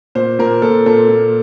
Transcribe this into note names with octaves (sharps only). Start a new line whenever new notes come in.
A#2 C5
A#2 A#4
A#2 A4
A#2 A4
A#2